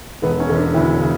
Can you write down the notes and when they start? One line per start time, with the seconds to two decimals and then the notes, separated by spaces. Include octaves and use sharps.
0.22 E1 B3
0.40 C#4
0.49 E1
0.58 D4
0.74 D2 E4
1.01 C#3